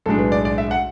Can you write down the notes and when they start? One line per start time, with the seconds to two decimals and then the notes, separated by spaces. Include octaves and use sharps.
0.06 B1 A2 G#3 D4 A4
0.19 B4
0.32 D5
0.45 D5
0.58 E5
0.71 F#5